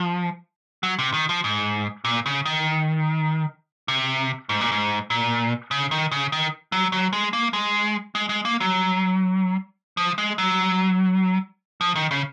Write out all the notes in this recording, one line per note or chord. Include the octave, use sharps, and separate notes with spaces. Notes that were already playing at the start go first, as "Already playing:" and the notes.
Already playing: F3
F#3
C3
D#3
F3
G#2
A#2
C#3
D#3
C3
G#2
A#2
G#2
A#2
C#3
D#3
C#3
D#3
F#3
F#3
G#3
A#3
G#3
G#3
G#3
A#3
F#3
F3
G#3
F#3
F3
D#3
C#3